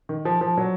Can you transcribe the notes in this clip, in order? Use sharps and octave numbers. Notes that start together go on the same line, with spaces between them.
D#3
F3
F3
F#3